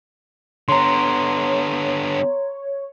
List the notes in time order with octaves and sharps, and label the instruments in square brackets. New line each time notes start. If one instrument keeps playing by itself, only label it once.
[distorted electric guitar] D3 B3 [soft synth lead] C#5 [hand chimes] A#5 C6